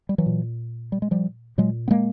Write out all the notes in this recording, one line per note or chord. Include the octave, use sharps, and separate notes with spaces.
G3
E3 F#3
A#2
G3
G#3
F3 G3
A#2 F#3 G#3
B3
G#3 A#3